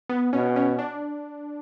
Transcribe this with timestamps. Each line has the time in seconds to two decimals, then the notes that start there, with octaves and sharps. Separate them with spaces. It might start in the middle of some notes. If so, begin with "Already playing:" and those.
0.09 B3
0.33 B2 C#4
0.56 C#4
0.79 D4